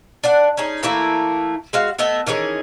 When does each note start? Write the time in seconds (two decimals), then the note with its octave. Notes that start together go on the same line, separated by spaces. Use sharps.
0.24 D4 D5 F#5
0.57 C#4 D#4 G#4
0.83 E3 A3 A#3 E4
1.73 G#3 F#4 F5
1.98 A3 B3 D#5 E5
2.27 D#3 E3 C#4 G#4